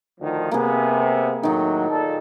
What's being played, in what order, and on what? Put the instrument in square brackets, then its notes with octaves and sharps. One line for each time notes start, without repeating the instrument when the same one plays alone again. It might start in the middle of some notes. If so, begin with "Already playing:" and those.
[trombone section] D2 D#3 F3
[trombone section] C3 B3 [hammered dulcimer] A#3 G#4
[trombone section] A2 F#3 [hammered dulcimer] D#3 D#4
[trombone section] A#2 A4